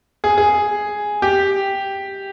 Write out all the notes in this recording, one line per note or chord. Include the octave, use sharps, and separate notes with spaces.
G#4
G#4
G4